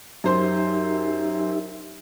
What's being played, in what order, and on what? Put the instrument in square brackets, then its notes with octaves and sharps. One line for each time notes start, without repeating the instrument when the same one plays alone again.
[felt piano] F#2 C5 C6 [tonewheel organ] D#4 G4 E5